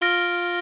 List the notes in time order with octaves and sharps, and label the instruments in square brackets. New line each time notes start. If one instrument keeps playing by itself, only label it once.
[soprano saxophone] F4 [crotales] F6 A#6 D7 G7